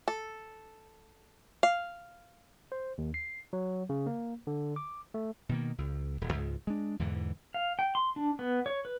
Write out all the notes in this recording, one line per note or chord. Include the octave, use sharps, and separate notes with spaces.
A4
F5
C5
D#2
C7
F#3
C#3
A#3
D3
D6
A3
B2 D#3 A#3
C#2
D#1
C#2 G#2
G#3 D4
E2 G#2 D3 E3
F5
G5
C6
D4
B3
C#5
B4